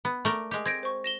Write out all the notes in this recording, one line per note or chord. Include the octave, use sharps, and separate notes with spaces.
B3
A3 A#4 D5
G#3 G4
C4 G#6 A#6 D7
C5 C#6
A#6 E7 G7